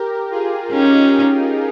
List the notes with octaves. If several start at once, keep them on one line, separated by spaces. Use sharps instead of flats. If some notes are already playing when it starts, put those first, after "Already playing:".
Already playing: G4 A#4
F4 G#4
C#4 D#4 G4